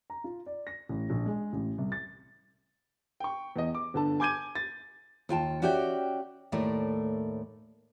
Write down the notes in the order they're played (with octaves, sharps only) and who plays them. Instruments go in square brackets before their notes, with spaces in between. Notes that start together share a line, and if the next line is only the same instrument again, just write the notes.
[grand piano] A#5
F4
D5
A#6
A1
A#1
G#3
A1
C2
A6
[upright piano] G5 C#6
E2 D#5
D6
G1 D3 A5
G#5 D6 G6 G#6 D#7
A6
[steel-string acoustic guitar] D#2 F4 G5 A5
C#4 F#4 G4 D5 E5 G5
D#2 A2 A3 A#4 D5